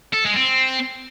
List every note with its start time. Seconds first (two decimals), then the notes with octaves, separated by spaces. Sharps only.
0.13 A4
0.25 G#3
0.37 C4